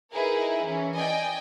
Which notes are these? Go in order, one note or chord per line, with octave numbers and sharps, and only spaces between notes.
D#4 E4 G#4 A#4 B4
E3 C#4
D5 D#5 G5 G#5